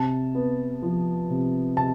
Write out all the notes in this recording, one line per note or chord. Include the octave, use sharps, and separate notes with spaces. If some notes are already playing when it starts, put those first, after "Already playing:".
Already playing: C3 A5
B3
F3
C3
C3 A5